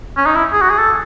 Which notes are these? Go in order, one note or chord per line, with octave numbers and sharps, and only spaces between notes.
C#4
D#4
E4
G#4
F#4
G#4
A4